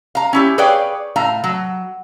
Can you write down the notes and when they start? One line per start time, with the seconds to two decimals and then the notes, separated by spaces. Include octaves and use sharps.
0.15 F5 A#5
0.33 C#4 E4 G4
0.58 G#4 B4 C#5 D5 F5 G5
1.16 A2 F5 A#5
1.44 F#3